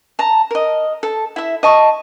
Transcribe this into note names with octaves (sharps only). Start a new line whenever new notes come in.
A5 A#5
A#4 D#5
A4
E4 E5
D#5 A5 C#6